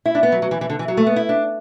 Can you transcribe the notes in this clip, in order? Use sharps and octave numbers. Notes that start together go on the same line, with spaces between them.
E4
D4
B3
F#3
F#3
E3
E3
D3
E3
F#3
A3
B3
E4
D4